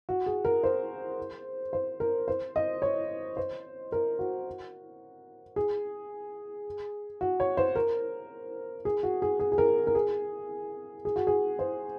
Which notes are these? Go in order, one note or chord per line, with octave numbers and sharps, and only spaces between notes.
F#4
G#4
A#4
C5
C5
A#4
C5
D#5
C#5
C5
A#4
F#4
G#4
F#4
C#5
C5
A#4
G#4
F#4
G#4
G#4
G#4
A#4
A#4
G#4
G#4
F#4
G#4
C5